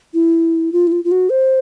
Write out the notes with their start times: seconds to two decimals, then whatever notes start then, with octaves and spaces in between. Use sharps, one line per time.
0.14 E4
0.73 F4
0.87 E4
0.92 F4
1.04 F4
1.12 F#4
1.30 C5